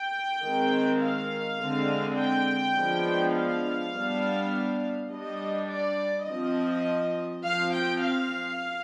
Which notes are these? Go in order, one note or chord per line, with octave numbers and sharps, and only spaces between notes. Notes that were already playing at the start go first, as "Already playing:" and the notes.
Already playing: G5
D#3 G#3 C4
F5
D3 G#3 C4
G5
F3 G#3 B3 D4
F5
G3 B3 D4
G3 D4 D#5
D5
F3 C4 D#5
F3 C4 F5
G5
F5